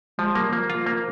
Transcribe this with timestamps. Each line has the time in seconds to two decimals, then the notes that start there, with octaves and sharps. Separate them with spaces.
0.18 F3 G#3
0.35 G3 A#3
0.52 F3 A#3
0.70 F3 F4
0.86 A#3